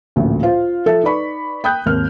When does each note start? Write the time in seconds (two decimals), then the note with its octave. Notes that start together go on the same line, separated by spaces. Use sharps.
0.16 A1 D2 A#2 F3
0.43 F4 C5 F5
0.86 F3 A4 E5
1.03 D#4 B4 D5 B5 C#6
1.64 G5 B5 D#6 F#6 G6
1.86 G#1 D#2 F6